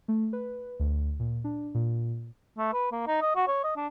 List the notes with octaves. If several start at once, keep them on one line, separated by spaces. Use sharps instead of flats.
A3
B4
D2
A#2
D4
A#2
A3
B4
A#3
D#4
D#5
F#4
C#5
D#5
D4